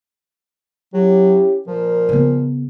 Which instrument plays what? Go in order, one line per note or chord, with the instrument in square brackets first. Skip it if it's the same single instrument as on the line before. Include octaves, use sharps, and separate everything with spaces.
[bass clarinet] F#3 [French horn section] C#4 E4 G4
[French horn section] A#2 A#4 [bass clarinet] F3
[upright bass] C#3 B3